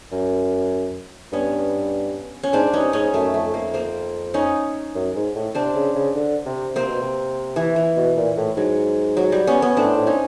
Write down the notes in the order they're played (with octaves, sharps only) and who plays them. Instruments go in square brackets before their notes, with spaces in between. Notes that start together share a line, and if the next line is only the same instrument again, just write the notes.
[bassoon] F#2
[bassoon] G2 [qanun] B3 C#4
[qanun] C#4
[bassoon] G#2 [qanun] C4 D4
[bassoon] G2 [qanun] C#4 D#4
[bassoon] G#2 [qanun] C#4 D#4
[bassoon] F#2 [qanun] A3
[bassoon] F2 [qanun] A3
[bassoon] F2 [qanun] A#3
[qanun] A#3 C4
C#4 D#4
[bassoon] F#2
G#2
A2
[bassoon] C3 [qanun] C4 D4
[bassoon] C#3
C#3
D3
C3
[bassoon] C3 [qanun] A#3 C4
[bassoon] B2
C3
[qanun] E3
E3
[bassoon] B2
A#2
A2
[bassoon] G#2 [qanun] F#3
[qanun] F#3
G3
B3 C#4
B3 C#4
[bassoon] A2 [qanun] C4 D4
[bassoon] A2
[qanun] C#4 D#4